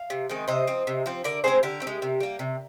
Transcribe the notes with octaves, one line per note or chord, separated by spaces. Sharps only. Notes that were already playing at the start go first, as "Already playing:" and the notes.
Already playing: F5
C3
D#3 G#3 C4
C3 C5 D#5
F3 C4
C3
F3 C4
D3 A#4 D5
G#3 C4 G#4 C5
D3 G4 A#4
C4
G#3
C3
G3 A#3
C3